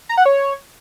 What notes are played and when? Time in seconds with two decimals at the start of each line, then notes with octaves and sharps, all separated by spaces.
0.09 A#5
0.17 F#5
0.26 C#5